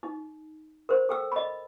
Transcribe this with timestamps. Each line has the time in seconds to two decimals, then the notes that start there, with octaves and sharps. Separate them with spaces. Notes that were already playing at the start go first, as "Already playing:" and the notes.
0.03 D#4
0.89 A#4 C5
1.09 A4 G5 E6
1.32 D#5 B5